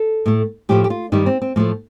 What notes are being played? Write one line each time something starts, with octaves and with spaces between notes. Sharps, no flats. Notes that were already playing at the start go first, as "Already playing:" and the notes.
Already playing: A4
A2 A3
A2 F3 A3 G4
G4
F4
G2 D#3 G3 D#4
C4
C4
A2 F3 A3 A#3